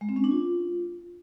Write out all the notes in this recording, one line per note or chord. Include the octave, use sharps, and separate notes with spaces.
G#3
C4
C#4
D4
F4